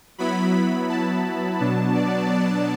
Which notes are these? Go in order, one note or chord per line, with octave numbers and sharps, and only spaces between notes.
F#3 B3 E4 B5
A5
B2 F#3 B3 D4 A5
D5
D5